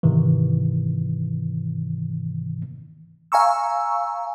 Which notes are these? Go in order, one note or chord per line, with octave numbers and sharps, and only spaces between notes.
G#2 C3 D#3 E3
F5 G#5 A#5 C#6 E6